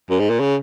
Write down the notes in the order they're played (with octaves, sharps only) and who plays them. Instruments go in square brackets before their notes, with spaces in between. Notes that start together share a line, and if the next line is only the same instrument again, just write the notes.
[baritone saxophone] F#2
G#2
A#2
C#3